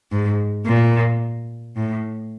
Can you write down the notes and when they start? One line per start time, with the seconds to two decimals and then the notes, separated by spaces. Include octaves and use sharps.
0.12 G#2
0.66 A#2
1.76 A2